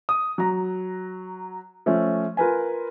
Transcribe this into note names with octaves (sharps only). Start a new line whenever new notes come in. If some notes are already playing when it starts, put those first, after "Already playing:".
D#6
F#3 A#5
F3 A3 C#4
F4 A#4 B4 G#5